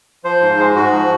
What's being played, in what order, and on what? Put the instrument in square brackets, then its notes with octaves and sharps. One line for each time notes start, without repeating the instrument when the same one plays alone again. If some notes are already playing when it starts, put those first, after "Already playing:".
[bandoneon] F3 C5
G#2
G#3
G#2 F#4
F3